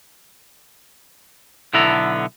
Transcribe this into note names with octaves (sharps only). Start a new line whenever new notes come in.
B1 D3 B3 E4 A4 A#5